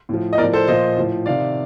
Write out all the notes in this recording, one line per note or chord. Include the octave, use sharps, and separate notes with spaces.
A2 F3
D#5
A2 A#4 D5
F3
A4 C5
A#2 F3 C5 D#5
A2 F3
C3 D#3 D5 F5